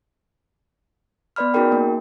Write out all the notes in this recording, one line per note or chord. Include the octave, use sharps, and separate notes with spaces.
B3 B4 D5 B5 F6
C#4 D#4 F#4 G#4 A#4 G5
A#3